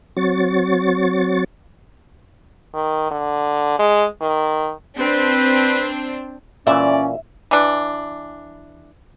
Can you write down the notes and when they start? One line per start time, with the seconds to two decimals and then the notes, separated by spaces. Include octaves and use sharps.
0.17 F#3 C4 F#4 C#5 C#6 A6
2.74 D#3
3.11 D3
3.79 G#3
4.21 D#3
5.00 C4 D4 B4
6.67 A#2 E3 C#4 D5 E5
7.51 E3 D4